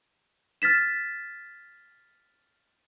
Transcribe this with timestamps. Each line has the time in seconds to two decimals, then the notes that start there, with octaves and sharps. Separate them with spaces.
0.62 F6 A6 B6 E7